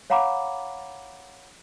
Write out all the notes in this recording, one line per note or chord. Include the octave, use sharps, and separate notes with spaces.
C#5 F5 F#5 A#5 B5 D6